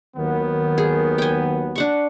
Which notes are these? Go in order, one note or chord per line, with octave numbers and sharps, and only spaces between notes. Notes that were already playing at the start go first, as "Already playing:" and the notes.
D#2 D#3 F#3 B3
G#4
G5 G#5
D4 F#5 C#6